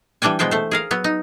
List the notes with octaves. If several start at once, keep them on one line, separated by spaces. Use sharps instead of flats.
E3 G3 D4 G5 G#5
B2 G#3 B3 C5 G5
A3 C5
G#4 A#4 F5
F#3 B3
D#4